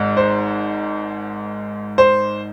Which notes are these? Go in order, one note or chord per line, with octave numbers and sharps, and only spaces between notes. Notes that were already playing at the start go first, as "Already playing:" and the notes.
Already playing: G#1 G#2
C5
C5